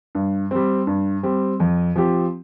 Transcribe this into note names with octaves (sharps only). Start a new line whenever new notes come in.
G2
G3 C4
G2
G3 C4
F2
F3 C4 G4